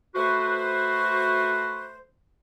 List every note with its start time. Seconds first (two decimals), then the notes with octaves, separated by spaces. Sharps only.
0.15 A3 F#4 B4 C5